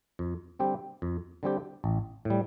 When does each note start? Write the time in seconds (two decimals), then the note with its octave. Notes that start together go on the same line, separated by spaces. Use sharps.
0.19 F2
0.59 D3 G3 C4 G4
1.02 F2
1.43 D3 G3 C4 G4
1.84 A1
2.25 A2 G3